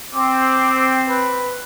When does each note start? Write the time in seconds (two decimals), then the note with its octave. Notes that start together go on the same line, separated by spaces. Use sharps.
0.15 C4 D6
1.08 B4